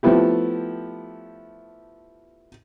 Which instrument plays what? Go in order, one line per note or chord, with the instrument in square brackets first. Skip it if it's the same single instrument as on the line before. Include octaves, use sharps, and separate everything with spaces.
[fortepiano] F3 A3 B3 E4 G4